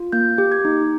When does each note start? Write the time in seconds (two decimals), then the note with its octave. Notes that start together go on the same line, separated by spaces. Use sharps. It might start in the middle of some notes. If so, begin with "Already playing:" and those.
Already playing: F4
0.12 A#3 G6
0.38 G4
0.52 G#6
0.65 D#4